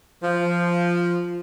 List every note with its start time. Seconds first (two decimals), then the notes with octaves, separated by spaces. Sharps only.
0.23 F3